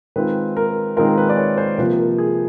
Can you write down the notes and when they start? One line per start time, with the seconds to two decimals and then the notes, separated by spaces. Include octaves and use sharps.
0.16 D#3 G#3 C4 F4 B4
0.57 A#4
0.96 D#3 G#3 C4 F4 A#4
1.18 B4
1.29 D5
1.37 C#5
1.57 C5
1.78 C3 F3 A#3 B4
1.97 A#4
2.18 G#4